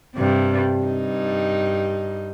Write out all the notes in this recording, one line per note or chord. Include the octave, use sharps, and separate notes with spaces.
G2 C3
G2 D#4